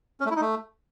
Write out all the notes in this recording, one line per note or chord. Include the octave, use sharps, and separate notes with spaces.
C#4
A3
E4
D#4
A3